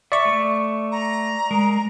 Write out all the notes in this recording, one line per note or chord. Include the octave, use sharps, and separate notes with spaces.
D5 E5 C#6
A3
A#5
G#3 A#4